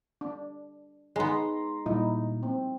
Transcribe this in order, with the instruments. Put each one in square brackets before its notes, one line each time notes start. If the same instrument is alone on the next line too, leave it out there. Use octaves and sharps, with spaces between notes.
[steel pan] D4
[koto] G#3 B3 [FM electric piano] D#4 A#5 C6
[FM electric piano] A#2 [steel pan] G3 D#4 E4
[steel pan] C4